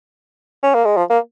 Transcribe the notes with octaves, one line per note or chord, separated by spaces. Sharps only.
C#4
A#3
G#3
F3
A#3